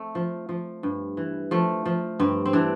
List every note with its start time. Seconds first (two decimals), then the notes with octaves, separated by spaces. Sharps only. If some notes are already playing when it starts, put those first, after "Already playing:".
Already playing: A3 C4
0.15 F3
0.49 F3
0.83 G2
1.17 E3
1.51 F3 A3
1.86 F3
2.20 G2 C4
2.46 C4
2.53 E3 D4